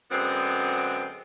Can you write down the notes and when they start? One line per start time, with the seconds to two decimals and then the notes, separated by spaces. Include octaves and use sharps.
0.11 F#2 D3 G#3 B3 C4